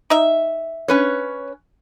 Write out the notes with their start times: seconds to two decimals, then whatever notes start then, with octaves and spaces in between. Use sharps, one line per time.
0.10 D#4 E5
0.88 C#4 B4 C#5